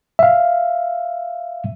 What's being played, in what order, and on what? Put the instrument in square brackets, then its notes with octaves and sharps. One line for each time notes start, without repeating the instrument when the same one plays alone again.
[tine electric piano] E5 F5